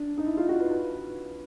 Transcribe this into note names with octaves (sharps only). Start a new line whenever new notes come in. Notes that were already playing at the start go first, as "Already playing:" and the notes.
Already playing: D4
D#4
E4
F4
F#4
B4
B4